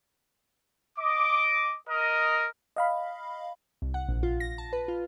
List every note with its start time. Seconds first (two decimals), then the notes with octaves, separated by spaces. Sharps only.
0.99 D#5 D6
1.89 A#4 D#5
2.76 D#5 F5 B5
3.82 C2
3.94 F#5
4.09 A#1
4.23 F4
4.40 A#6
4.58 A5
4.73 B4
4.88 F4